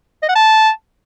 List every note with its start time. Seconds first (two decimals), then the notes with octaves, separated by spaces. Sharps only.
0.23 D#5
0.29 F#5
0.35 A5